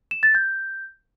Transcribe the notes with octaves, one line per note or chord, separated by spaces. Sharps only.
E7
A6
G6